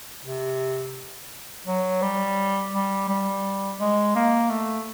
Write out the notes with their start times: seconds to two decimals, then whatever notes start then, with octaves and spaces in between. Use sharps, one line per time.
0.25 C3
1.66 F#3
2.02 G3
2.73 G3
3.09 G3
3.79 G#3
4.15 A#3
4.50 A3